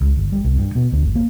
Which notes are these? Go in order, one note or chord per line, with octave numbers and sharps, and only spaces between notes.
C#2
G1
G3
C2
G2
B2
D2
G1
A#3